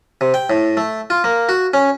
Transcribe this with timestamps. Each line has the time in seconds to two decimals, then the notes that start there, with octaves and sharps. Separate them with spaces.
0.21 C3
0.34 G5
0.50 A2
0.77 A3
1.10 F4
1.24 A#3
1.49 F#4
1.74 C#4